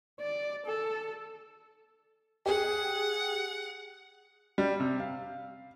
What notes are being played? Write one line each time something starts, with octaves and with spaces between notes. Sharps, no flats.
D5
A4
G4 G#4 F#5
G3
C3
F5